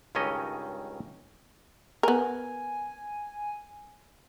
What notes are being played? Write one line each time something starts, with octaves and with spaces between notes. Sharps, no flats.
C#2 G2 D#3 C#4 A4 D#5
B3 A#4 G#5